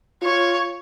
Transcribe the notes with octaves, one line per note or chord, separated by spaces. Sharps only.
F4 C#5